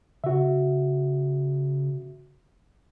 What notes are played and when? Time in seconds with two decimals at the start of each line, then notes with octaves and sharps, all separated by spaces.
0.24 C#3 F#4 E5